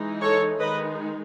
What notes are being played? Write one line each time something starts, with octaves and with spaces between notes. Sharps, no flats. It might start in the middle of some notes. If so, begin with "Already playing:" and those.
Already playing: E3 G#3 D#4
A4 C#5
D#3 G#3 D#4 B4 D#5